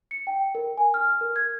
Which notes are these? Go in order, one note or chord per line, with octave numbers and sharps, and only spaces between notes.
C#7
G5
A#4
G#5
F6
A#4
G#6